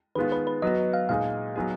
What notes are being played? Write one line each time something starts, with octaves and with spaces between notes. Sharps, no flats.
D#3 G#3 B3 F4 B4
B4
B4
F#3 B3 F#4 D#5
F5
A#2 G#3 D#4 G#4 F5
F#3 B3 D#4 G#4